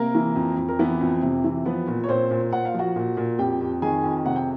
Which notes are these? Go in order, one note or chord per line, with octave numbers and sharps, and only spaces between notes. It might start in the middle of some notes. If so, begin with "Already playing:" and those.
Already playing: C3 A#3 A#4
E3
F2
F2
A#4
E3 B3 B4
F2
C3
E3
F3 B3 B4
A#2
C#5
A#2 C4 C5
A#2
A#2 F#5
F5
F3 F#4 F#5
A#2
A#2
F2 G4 G5
F2
D#3 G#4 G#5
F2
C3 F#5
G5